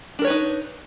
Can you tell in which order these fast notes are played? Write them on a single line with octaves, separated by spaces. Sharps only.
D4 A#4 C#5 B4 D#4